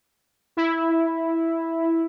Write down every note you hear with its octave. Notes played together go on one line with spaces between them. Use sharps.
E4